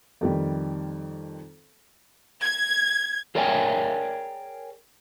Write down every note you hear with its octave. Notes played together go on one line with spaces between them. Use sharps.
F2 D#3 G3
G#6
G#4 A#4 C#5 D5 G5 G#5